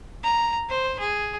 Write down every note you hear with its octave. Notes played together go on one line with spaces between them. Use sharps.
A#5
C5
G#4